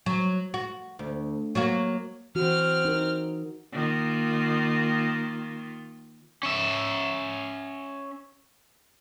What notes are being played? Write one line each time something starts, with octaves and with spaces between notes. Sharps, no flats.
F#3
F#4
D2
F#3 A#3 F#4
E3 C4 F#4 F6
D#4 A#4
D#3 A#3 F4
C#4 E5